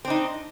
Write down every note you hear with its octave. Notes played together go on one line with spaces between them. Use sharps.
C4 D4 D#4